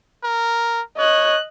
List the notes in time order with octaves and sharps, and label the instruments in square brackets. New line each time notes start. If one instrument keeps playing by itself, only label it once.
[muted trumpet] A#4
[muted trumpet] C#5 [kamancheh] D#5 F#6